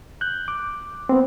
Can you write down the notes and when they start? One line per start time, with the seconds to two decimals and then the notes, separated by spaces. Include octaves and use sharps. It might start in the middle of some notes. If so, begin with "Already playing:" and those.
0.21 F#6 G6
0.48 D6
1.09 B3 C4